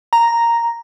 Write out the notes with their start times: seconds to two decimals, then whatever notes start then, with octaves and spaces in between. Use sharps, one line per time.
0.13 A#5